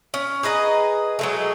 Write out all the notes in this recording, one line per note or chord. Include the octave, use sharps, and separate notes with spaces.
C#4
G#4 B4 D#5 A#5
F#3 G#3 A3